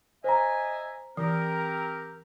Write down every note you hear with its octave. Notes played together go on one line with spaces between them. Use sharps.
C5 D#5 E5 G#5 A#5
E3 C4 G4 A#4